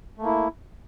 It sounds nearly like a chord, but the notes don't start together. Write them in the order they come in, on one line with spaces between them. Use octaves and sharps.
A3 A#3 E4